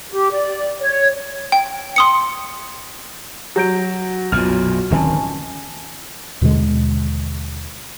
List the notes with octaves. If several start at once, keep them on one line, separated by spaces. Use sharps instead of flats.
G4
D5
C#5
G5
C6 D#6 C#7
F#3 G6 D7
B1 F#2 A#2 F4 F#4 F6
D1 D#3 C4 C#4 G#5 A5
D#2 B2 D3 G#3